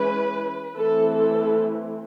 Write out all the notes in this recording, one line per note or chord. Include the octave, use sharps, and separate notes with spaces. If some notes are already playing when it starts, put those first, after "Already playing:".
Already playing: E3 G#3 C#4 B4
E3 A3 C4 A4
A4